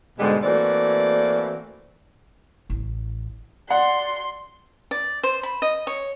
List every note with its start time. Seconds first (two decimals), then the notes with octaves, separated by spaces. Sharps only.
0.18 G#2 B2 D3 G3 G#3
0.44 E3 A3 A#3 C4 F#4 D5
2.70 A1
3.70 D5 F#5 C6
4.91 D5
5.23 C5
5.43 B5
5.62 D#5
5.87 C#5